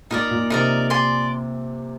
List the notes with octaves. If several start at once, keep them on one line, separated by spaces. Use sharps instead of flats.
A#2 D#4 A#4 D5
A#2
C3 D#4 A#4 D5
D5 G#5 C6